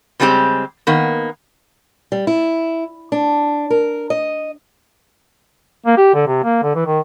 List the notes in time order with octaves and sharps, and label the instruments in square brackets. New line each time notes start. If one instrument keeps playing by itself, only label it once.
[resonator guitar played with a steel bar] C#3 G3 G#3 C4 G4
D#3 A#3 B3
[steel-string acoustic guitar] G3
E4
D4
A#4
D#5
[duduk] A#3
G4
D3
C3
A#3
D3
E3
D#3